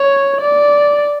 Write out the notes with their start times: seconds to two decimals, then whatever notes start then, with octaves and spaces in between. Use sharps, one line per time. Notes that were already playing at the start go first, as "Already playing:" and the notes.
Already playing: C#5
0.41 D5